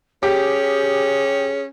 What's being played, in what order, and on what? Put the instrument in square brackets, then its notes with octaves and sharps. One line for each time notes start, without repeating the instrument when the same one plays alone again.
[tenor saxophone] C#4 [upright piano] G4 [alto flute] G#4